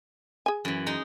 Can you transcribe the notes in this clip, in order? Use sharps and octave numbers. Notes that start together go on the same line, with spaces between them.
G#4 G#5
F#2 E3
G#3 D#4